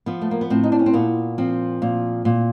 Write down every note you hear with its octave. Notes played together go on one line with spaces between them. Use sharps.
F3 B3
A3
A#3
B3
A2 C4
D#4
D4
C#4
C4
A#2 B3
F3 C4
A#2
A#2